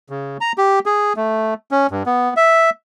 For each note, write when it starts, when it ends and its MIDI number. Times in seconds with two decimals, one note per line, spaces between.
0.10 0.37 49
0.41 0.52 82
0.58 0.79 67
0.86 1.13 68
1.16 1.54 57
1.71 1.87 61
1.91 2.03 43
2.06 2.34 59
2.37 2.70 76